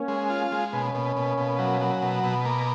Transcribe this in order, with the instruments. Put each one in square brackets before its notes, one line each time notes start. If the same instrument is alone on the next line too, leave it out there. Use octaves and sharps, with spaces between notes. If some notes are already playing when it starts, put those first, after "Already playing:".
Already playing: [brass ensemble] A#3 C#4
[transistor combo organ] G#3
F4
G#3
[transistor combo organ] B2 [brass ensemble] A#3 C#4
[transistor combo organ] B2
B2
B2
F#3
F#3
B2
B2
A#3